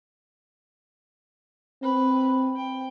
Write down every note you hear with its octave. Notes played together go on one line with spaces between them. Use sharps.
C4 B4
G5